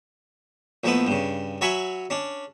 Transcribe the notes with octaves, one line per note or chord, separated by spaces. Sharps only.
A#1 F3 A3 B3 E4 D#6
G2 C#3
F#3 C#5 E5 G#5 B5 C#6
C#4 D4